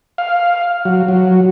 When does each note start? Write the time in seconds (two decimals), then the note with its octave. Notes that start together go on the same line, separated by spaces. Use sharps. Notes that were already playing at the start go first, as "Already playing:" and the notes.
0.18 F5
0.85 F#3
1.08 F#3